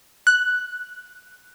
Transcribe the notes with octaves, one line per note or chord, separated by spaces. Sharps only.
F#6